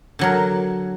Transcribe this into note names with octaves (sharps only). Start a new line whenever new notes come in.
D3 F#3 A#4